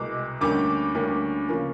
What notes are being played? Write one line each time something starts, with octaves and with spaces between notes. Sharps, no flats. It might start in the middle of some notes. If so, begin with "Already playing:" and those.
Already playing: C2 B2 G#3 D6
D2 D3 G3 A#3 C#4 D6
D2 D3 G3 A#3 C#4
C#3 F3 A#3 C#4